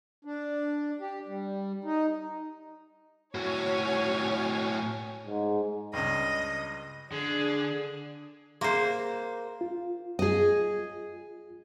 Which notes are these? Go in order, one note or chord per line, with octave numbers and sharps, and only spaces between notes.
D4
G4
G3
D#4
A2 F#4 C#5 G#5
G#2
C#2 G2 D#5
D3 D4 G#4
A#3 G#4 C5 E5 C6
F4
G#4 D#5